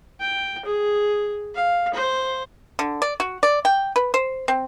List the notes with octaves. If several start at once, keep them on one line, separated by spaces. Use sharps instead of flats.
G5
G#4
F5
C5
D3
D5
F#4
D5
G5
B4
C5
C4